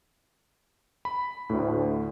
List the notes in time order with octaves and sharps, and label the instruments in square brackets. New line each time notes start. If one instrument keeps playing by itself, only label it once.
[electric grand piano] B5
[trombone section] D2 [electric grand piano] A2